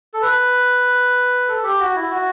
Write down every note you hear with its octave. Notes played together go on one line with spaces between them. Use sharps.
A4
B4
A4
G4
F#4
E4
F#4